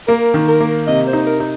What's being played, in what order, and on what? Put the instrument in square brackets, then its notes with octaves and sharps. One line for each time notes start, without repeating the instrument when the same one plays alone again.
[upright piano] A#3 [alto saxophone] A#4
[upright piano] D#3
[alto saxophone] A#4
[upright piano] A#3
[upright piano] C3 [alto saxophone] D#5
[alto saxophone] C5
[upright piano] D#4
[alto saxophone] A#4
[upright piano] D#4